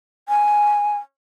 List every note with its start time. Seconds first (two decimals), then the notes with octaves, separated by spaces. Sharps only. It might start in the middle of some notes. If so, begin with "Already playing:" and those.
0.29 G#5